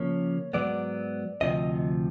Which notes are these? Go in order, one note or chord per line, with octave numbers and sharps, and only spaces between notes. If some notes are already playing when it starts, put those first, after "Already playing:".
Already playing: C#3 F3 A#3 C#4 C#5
G#2 D#3 F#3 B3 D5
D2 C3 F3 D#5